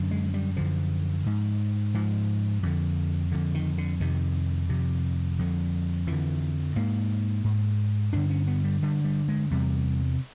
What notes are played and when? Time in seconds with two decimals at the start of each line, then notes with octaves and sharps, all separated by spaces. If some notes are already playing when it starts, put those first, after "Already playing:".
Already playing: F#2 D3
0.11 G#3
0.34 G3
0.57 F#2 D3 F3
1.26 G#2
1.94 G#2 F3
2.63 F2 D3
3.32 F2 D3
3.54 D#3
3.78 D3
4.00 F2 C3 D#3
4.69 F2 C3
5.39 F2 D3
6.07 F2 D3 E3
6.76 G#2 A#3
7.44 G#2
8.13 G2 D3 D4
8.30 C#4
8.47 B3
8.64 G3
8.82 G2 D3 G3
9.04 G3
9.28 G#3
9.51 E2 C3 G3